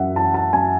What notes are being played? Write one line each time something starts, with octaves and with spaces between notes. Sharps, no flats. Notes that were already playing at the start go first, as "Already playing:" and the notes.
Already playing: F#2 E3 E5 F#5
E3 A5
A5
F#2 G#5